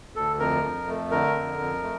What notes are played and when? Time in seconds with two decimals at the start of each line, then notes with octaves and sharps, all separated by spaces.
0.16 D2 A4
0.39 F2 A#4
0.63 F2
0.87 A3
1.11 D3 A#4
1.36 F2
1.59 F2
1.83 A3